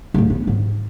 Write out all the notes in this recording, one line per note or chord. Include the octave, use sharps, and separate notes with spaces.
D1 A1
B3
G#2